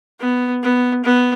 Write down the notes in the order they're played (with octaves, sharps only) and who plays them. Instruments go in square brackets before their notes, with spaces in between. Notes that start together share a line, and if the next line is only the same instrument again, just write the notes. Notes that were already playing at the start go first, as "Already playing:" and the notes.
[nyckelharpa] B3
B3
B3